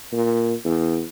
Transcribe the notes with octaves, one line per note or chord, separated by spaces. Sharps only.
A#2
E2